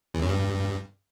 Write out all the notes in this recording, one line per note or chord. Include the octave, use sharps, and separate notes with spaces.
E2
F#2
G2